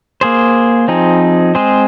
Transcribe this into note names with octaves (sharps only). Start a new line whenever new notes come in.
A#3 G#4 C5
F3 C4 D#4 G#4
G#3 C4 G#4 C5